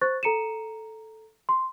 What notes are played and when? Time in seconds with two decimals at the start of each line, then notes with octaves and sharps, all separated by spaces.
0.02 C5 C#6 F#6 A6
0.23 A4 A#5 C#7 D#7 E7
1.49 C6